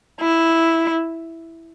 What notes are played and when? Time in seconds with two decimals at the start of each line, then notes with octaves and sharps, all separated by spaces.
0.21 E4